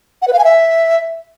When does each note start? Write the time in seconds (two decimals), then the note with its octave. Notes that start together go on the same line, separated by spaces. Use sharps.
0.22 F#5
0.28 B4
0.33 F5
0.39 G#5
0.44 E5